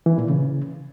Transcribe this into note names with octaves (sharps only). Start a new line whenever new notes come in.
E3
A#2
C#3